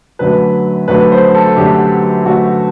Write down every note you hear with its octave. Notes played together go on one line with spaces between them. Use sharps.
F#2 D3 F#3 A3 B4
F#2 D3 F#3 A3 B4
C5
A4
F#2 D3 F#3 A3 G4
F#2 D3 F#3 A3 F#4